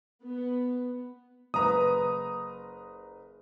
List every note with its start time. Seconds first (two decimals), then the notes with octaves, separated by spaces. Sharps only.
0.24 B3
1.54 F#1 B4 A#5 D#6